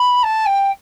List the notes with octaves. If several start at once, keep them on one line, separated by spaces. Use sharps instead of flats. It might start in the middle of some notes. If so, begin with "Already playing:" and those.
Already playing: B5
A5
G5